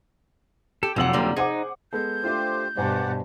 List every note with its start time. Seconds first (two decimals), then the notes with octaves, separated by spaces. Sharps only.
0.83 G4 A4
0.96 F1 F#3 G#3 F4 G4 F#5 E6 F#7
1.13 D3 G3 A#3
1.36 D#4 G#4 C5 F#5 D6
1.93 G#3 B3 A4 G6
2.24 A3 D4 F4 G4 C5
2.77 G2 B2 C5 D5 F#5 G#5 A5